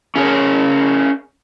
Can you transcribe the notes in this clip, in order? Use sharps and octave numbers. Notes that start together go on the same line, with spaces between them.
C#4 G#4 A#4 C#5